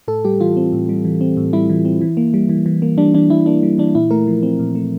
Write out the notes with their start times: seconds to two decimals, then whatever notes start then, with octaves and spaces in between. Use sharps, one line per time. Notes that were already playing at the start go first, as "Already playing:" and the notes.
0.08 A2 A4
0.25 G3 G4
0.41 E3 F4
0.57 C4
0.73 A2
0.89 G3
1.05 E3
1.21 C4
1.37 A2
1.53 G3 E4
1.69 E3
1.85 C4
2.01 E3
2.17 A#3
2.34 G3
2.49 E3
2.66 E3
2.82 A#3
2.98 G3 D4
3.14 E3 D4
3.30 E3 E4
3.46 A#3 D4
3.63 G3
3.78 E3 D4
3.95 A#2 E4
4.11 A3 A#4
4.27 F3
4.43 C4
4.59 A#2
4.75 A3